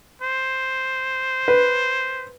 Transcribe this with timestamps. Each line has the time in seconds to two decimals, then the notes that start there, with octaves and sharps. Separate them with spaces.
0.21 C5
1.48 B4